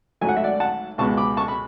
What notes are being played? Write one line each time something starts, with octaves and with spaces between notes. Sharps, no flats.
G#1 G#2 F#3 A3 G#5
F#5
E5
D5 F#5
F#5 A5
C#2 B2 G#3 B3 A5 C#6
B5 D6
A5 C#6
B5